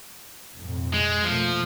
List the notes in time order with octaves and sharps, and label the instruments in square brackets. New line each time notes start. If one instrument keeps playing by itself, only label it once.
[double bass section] B1 F2 A2
[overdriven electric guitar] G#3
[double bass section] B2 A3 A#3 [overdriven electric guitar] F3